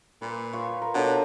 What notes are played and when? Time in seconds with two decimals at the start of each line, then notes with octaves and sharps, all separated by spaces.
0.22 A#2 B4
0.53 F4 C#5
0.82 A#4
0.94 B2 D4 A4 C#5 F#5